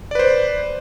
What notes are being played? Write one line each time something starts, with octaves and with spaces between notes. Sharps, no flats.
B4 C5 D5